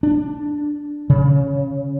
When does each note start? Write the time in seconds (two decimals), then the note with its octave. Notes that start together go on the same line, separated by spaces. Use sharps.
0.03 D4
1.10 C#3